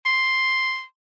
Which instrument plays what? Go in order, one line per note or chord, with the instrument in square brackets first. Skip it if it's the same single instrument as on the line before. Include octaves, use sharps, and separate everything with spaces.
[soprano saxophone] C6